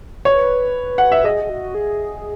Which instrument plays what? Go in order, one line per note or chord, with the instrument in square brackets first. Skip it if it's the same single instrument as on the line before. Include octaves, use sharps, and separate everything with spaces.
[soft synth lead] B4 [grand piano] C#5
[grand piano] F#5
E5
[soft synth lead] G#4 [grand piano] D#5
[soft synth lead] G#4
F#4
G#4